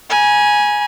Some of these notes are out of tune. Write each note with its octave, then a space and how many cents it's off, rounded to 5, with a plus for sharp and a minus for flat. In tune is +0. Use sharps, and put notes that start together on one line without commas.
G#5 +0 B5 -45